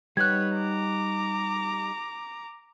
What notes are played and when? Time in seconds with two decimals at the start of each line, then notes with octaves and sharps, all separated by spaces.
0.17 G3 D#4 B4 C#5 F#5 F#6 G#6
0.57 A#5 D6